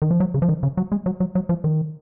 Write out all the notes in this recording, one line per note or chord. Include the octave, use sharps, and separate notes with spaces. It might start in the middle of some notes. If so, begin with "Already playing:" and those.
D#3
F3
F#3
C#3
F3
D#3
C#3
F#3
G#3
F#3
F#3
F#3
F3
D#3